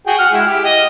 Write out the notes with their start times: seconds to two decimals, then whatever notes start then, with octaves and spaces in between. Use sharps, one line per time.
0.07 F#4 G#4 G5
0.19 F#5 F6
0.33 G#3 E4
0.47 G4
0.65 D#5